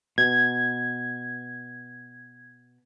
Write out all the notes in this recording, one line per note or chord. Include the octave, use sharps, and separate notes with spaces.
B2 G#6